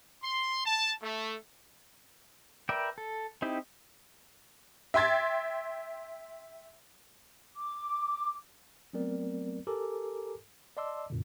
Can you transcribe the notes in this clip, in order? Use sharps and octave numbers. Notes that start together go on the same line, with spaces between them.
C6
A5
A3
A#4 B4 D5 E5 G5
A4
C4 D#4 E4 G4
E5 G5 C6 G#6 A6
D6
F#3 A3 B3 C4 A#4 D5
G4 A4 A#4 G#5 A#5 D6
D5 D#5 A5 C6 D6 E6
F#2 A#2 D3